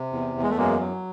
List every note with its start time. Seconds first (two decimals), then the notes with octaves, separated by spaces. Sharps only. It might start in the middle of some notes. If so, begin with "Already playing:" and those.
Already playing: C3
0.13 E2
0.36 E2
0.43 G#3
0.50 A3
0.57 F#2 G#3 A#3
0.80 F#3